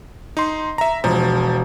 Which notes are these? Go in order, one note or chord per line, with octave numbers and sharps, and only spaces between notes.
D#4 C6
E5 A#5
E1 F3